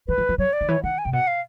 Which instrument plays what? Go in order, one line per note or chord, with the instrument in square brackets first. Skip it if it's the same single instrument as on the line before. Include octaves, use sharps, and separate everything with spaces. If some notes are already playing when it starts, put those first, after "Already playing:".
[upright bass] E3 [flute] B4
[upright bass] F3
F3
[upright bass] F#3 [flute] C#5
[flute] D5
[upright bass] D#3
[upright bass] E3 [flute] C#5
[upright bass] D#3 [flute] F#5
[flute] G#5
[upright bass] C3 [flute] G5
[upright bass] B2 [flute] F#5
[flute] F5